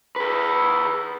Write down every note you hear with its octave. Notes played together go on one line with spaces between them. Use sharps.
G#4 B4